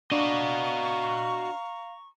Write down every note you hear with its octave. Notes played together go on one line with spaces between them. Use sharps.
D4 F#4 D#5 F5 A#5 C#6